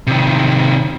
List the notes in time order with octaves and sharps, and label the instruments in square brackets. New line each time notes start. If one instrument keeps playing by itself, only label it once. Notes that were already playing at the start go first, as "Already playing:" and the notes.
[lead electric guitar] C3 D#3